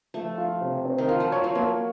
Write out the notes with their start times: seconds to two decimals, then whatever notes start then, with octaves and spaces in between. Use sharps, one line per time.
0.14 F3 A3
0.38 F4
0.61 C3
0.85 C4
0.98 D#3
1.08 F3 F4
1.20 F#3
1.32 F#3 C#5
1.44 F3
1.55 F#3 A#3